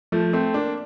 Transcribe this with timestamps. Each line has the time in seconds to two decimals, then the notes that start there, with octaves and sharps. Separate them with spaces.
0.12 F3 A3
0.33 A3 C4
0.54 A#3 D4